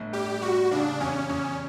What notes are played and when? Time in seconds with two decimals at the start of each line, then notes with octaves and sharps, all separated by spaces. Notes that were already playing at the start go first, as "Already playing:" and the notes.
Already playing: G1 A2
0.13 G3 G4
0.42 G3 F#4
0.71 C#3 D4
1.00 E2 C#4
1.29 E2 C#4